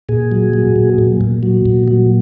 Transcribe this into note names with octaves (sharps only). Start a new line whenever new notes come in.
A#2 G#4
F#3
F#3
A#2
A#2
A#2
F#3
A#2
F#3